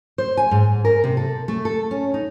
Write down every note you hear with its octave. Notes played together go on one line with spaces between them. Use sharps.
C5
G#5
G#2
A#4
C3
A4
A3
A4
C#4
D#4